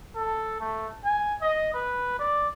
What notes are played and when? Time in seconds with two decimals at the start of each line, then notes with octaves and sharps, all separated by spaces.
0.15 A4
0.60 A3
1.05 G#5
1.42 D#5
1.74 B4
2.19 D5